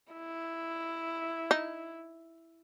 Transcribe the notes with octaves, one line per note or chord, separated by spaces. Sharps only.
E4
D#4